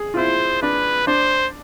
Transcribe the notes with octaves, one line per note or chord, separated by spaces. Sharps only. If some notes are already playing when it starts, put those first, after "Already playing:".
Already playing: G#4
F4
E4 C5
D4 B4
D4 C5